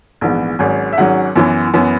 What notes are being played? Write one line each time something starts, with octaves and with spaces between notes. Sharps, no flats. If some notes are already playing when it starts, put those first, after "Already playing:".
A#1 G#2 E3 B3
G#1 G#2 F#3 C#4 G#5
E5
G#1 G#2 F#3 C#4 F#5
F#2 E3 B3
F#2 E3 B3